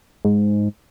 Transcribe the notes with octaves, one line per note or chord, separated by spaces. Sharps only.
G#2